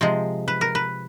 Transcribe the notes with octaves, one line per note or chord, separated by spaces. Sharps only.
C3 F3 G#3
B4
A#4
B4